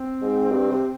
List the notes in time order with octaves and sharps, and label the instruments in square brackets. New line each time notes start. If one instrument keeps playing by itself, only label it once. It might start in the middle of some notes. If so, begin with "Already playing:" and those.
Already playing: [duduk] C4
[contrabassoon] G#2
G2
C3